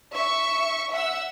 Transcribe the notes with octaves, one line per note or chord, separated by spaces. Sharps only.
E5 C#6
E5 F#5 E6